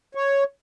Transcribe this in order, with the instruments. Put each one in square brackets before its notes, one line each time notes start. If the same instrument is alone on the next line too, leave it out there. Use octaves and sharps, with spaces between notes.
[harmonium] C#5